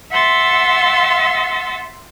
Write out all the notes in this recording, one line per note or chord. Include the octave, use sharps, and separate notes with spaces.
E5 F#5 C6 E6 A6